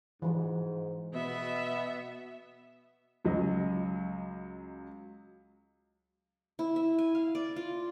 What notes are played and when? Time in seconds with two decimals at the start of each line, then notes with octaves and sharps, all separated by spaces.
0.22 G#2 E3 F3 F#4
1.13 B2 B3 E5
3.25 C#2 F#3 D#5
6.59 E4
6.76 E5
6.99 G#5
7.15 F5
7.35 D5
7.56 F4